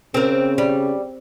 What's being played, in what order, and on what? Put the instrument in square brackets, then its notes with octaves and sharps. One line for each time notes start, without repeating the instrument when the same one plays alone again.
[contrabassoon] C#3 [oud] C4 A#4
[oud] G3